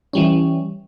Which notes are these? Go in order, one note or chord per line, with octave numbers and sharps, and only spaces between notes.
E3 G3 C#4